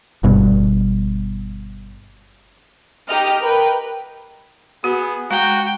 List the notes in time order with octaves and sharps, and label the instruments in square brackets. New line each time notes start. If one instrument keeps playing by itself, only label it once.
[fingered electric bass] G1 G2 B2
[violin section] D#4 G4 D#5 F6
A#4 B4 G5
[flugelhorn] B3 [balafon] F#4 [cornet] G#4
[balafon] G#3 [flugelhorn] F#4 [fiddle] G5 [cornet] A#5